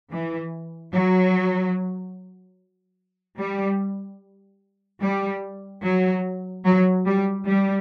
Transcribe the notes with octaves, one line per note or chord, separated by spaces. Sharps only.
E3
F#3
G3
G3
F#3
F#3
G3
G3